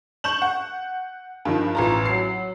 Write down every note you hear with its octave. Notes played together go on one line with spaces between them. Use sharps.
C#6 G6 E7 F#7
F#5
G2 D#3 F3
A1 F4 A#5
F#3 C7